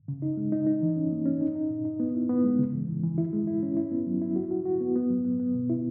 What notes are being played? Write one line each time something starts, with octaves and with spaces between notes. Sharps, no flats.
C#3
D#4
G#3
D#4
D#4
E3
C#4
A#3
C#4
D#4
D#4
A#2
D#4
B3
E4
B3
G#3
C#3
E3
E3
E3
E4
G#3
E4
C#4
E4
B3
F#3
E4
F#4
F#4
F#4
B3
B3
F#3
B3
B3
B2
E4